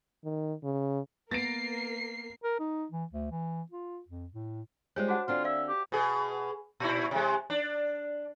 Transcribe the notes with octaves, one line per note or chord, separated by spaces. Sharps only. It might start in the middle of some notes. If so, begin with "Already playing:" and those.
D#3
C#3
A#3 B3 A#4 A6 A#6 C7 D7
A#4
D#4
E3
D2
E3
F4
F2
A2
G3 G#3 F4 C5 C#5
D4 F#4 F#5
D3 C4 D4 F4
D5 E5 F5
G4
B2 G#4
A#2 E4
C3 G#3
D4